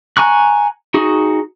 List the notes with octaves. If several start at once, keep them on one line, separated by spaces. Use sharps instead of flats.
G#5 A#5 C#6 F#6
D#4 F#4 G#4